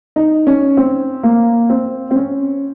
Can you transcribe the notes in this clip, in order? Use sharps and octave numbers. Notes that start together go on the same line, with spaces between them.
D#4
C#4
C4
A#3
C4
C4
C#4